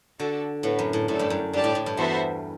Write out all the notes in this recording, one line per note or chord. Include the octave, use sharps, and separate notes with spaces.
D3 D4 F#4 A4 D5
A2 B3 F#4 B4
F#2
A2
A2 A3 D4 A4 D5
G2
F#2
G2 D4 G4 D5 A5
A2
A2
G2
E2 B3 F#4 A4 C5 E5